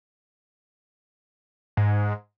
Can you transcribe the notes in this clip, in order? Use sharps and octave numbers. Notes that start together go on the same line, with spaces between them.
G#2